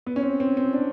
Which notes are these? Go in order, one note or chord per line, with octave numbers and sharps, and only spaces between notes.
B3
C#4
C4
C4
C4
D4